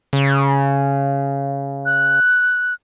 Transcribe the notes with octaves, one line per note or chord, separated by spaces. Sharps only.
C#3
F#6